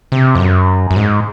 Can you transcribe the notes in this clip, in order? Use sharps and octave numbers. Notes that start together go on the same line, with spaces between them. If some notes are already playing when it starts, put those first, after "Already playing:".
C3
F2
F#2
F#2
G#2